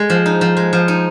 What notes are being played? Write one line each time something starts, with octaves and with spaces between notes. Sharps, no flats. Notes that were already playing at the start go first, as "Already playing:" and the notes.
Already playing: G#3
F3
D#4
F3
G#3
F3
D#4